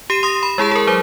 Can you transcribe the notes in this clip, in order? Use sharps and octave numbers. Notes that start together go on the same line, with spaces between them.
G4 C7 D#7 E7
C6 D#6 A#6
B5
G#3 E4 G#4 A5
G#4 A#4
F#3 C5 G7